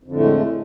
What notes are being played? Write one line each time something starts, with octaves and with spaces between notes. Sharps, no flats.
F2 A2 D3 G#3 A3